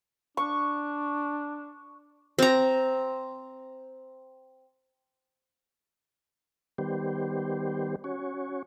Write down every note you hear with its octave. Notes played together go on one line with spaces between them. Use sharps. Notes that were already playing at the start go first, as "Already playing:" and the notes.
D4 C#6
C4 A#5
D#3 G3 B3 G4 C5
C#4 F#4 C#5